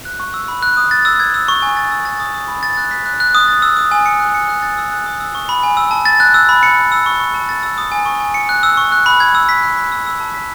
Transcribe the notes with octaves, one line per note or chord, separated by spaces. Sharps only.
F#6
C#6
E6
B5
F#6
D#6
A6
E6
G#6
E6
C#6
G#5
A6
E6
A6
D#6
D#6
B5
A6
F#6
B6
F#6
F#6
D#6
A6
E6
D#6
G#5
C#7
F#6
C#7
F#6
A6
E6
F#6
D#6
E6
C#6
B5
G#5
E6
A5
A6
F#6
E6
B5
C#7
F#6
E6
C#6
C#6
A5
A6
E6
D#6
G#5
C#6
G#5
C#7
F#6
E6
C#6
F#6
B5
G#6
E6
B6
F#6
B6
E6
E6
A5
B6